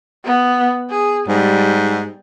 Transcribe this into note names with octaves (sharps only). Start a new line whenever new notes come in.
B3
G#4
G#2 G3